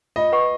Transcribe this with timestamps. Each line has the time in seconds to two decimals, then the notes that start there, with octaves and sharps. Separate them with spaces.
0.16 F4 D#5
0.32 B4 F#5 C#6